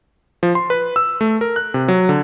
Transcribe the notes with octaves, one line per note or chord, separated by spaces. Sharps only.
F3
C6
B4
E6
A3
A#4
F#6
C3
F#3
D3